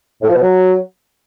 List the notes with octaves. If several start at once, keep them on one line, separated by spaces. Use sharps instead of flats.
A2
F3
B2
F#3